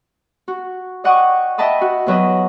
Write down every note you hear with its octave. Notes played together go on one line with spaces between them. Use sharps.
F#4
D5 D#5 F#5 G5 C#6 D#6
D#5 E5 G5 A5 B5 D#6
F#4
E2 F#3 B4 D#5